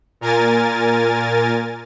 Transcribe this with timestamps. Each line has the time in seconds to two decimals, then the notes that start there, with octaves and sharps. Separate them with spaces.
0.21 A#2 A#4 G#5 A6